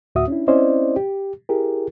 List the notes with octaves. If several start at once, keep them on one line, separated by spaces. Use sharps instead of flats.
D2 A2 F#4 E5 D#6
C#4 D4 E4
C4 C#4 E4 C5 D5 D#5
G4
E4 G4 G#4 A#4